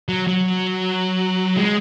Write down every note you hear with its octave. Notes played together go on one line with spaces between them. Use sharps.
F#3
F#3
G#3